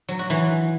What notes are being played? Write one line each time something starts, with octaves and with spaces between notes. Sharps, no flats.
F#3
F#4
E3